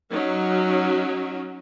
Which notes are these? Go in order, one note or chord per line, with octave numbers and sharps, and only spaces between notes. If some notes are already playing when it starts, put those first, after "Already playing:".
F#3 C#4 D#4